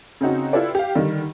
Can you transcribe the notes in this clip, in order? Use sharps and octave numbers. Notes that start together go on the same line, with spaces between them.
C#3 C4 D#4 F#4
E4 F4 G4 A4 B4 D5
G4 F5
D3 D#3 G3